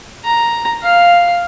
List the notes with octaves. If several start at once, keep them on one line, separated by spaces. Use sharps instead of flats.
A#5
F5